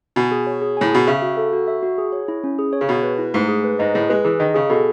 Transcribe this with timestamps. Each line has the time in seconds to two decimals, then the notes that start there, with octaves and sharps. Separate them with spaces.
0.16 B2 G#5
0.31 G#4
0.47 C#5
0.61 G#4
0.77 A2 G#5
0.92 B2 G#4
1.07 C#3 E5
1.22 F#4
1.37 A4
1.53 F#4
1.68 E5
1.83 F#4
1.98 G#4
2.13 C#5
2.28 E4
2.44 C#4
2.59 G#4
2.73 C#5
2.81 C#3
2.88 B2 G#4
3.03 B4
3.18 E4
3.34 G#2 A3
3.48 G#4
3.64 B4
3.79 G#2 D#5
3.94 A2 G#4
4.09 G#3 B4
4.24 E3 G#4
4.40 D#3 D#5
4.54 C#3 G#4
4.70 B2 A4